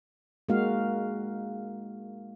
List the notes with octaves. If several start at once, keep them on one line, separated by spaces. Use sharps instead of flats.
G#3 A#3 D#4 F#4 F5